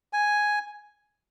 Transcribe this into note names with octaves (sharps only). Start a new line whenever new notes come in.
G#5